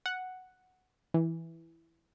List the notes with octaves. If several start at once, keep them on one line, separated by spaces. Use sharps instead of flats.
F#5
E3